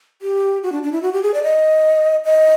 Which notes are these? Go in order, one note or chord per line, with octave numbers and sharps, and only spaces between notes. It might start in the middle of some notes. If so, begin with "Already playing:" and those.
G4
F#4
D4
D4
E4
F#4
G4
G#4
D5
D#5
D#5